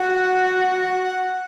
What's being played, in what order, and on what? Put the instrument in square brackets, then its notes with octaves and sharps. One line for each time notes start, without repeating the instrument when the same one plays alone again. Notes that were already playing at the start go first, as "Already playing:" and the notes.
Already playing: [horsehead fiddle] F#4 [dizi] F#5